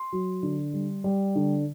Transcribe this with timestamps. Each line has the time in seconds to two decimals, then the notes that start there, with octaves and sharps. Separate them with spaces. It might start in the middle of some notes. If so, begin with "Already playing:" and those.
Already playing: C6
0.13 F#3
0.43 D3
0.73 G3
1.04 G3
1.35 D3